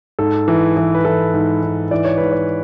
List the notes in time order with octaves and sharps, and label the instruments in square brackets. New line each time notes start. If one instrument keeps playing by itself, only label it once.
[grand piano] G#2 A4
E3
E3
B4
E3 A4
G#2
G#2
E3 D5
C#5
G#2 B4
C#5